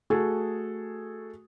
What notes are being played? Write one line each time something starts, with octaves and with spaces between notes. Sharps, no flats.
A3 F#4 G#4 A4